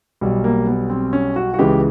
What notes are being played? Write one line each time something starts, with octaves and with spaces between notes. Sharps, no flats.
B1 B2 G3
A#3
B3
C4
C#4
F#4
F#4
C#2 C#3 E3 G#3 G4